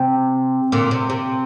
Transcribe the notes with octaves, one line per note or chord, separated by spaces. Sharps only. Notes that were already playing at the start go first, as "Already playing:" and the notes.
Already playing: C3
A#2 D3
C3
C3